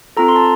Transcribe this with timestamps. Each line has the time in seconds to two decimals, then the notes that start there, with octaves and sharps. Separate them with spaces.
0.17 C4 F4 A4 A#5
0.28 C6
0.36 A5